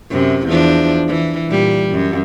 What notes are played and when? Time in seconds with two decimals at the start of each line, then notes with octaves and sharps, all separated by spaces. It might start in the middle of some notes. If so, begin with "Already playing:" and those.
0.10 F#2 C3
0.48 E2 F3 D4
1.08 E3
1.47 A#2 G3
1.92 F#2